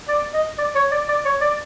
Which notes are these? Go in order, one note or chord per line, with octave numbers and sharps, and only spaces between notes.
D5
D#5
D5
C#5
D5
D5
C#5
D5